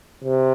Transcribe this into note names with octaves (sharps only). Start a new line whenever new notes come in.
C3